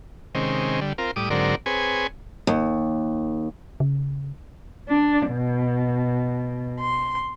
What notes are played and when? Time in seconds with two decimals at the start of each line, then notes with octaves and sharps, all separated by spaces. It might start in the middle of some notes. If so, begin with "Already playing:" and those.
0.35 C3 D#3 G#3 C4 C#4
0.81 D3 G3
0.98 C4 F4 A#4
1.16 A2 G3 D6 D#6
1.30 G#2 D3 F#3 C4 A#4 D5
1.66 C4 G#4 B4 C#5 G#5
2.47 D#2
3.80 C#3
4.87 D4
5.29 B2
6.80 C6